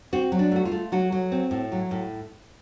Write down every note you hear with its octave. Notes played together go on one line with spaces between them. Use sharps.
C4 F#4
F#3
D4
A3 F#4
F4
A3
F#3 F#4
F#3
C4
A2
F#3
A2